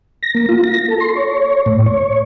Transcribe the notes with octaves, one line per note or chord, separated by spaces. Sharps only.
A#6
A#3
F4
A#6
A4
C6
C#5
A2
C#5